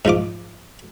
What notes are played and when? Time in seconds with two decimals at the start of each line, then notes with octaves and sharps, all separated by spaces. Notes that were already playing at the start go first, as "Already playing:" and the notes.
0.05 G#2 F3 F4 D6